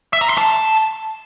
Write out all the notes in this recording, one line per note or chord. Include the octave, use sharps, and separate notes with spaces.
E5
A#5
C6
A5